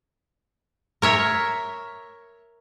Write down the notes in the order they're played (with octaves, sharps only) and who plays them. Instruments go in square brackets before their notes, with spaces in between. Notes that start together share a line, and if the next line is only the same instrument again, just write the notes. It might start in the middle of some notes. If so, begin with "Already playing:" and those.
[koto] A#4 C#5 E5